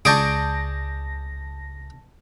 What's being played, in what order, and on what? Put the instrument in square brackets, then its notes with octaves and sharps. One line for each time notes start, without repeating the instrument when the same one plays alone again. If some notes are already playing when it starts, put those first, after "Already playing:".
[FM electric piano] C#2 A#6 [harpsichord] G#4 D5 C#6 [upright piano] A5 G6 D7